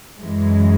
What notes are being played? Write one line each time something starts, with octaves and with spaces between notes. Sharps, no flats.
F#2 E3 G#3